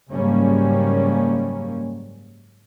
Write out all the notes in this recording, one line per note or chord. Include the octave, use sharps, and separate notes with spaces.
F#1 G#2 G3 A#3 C#4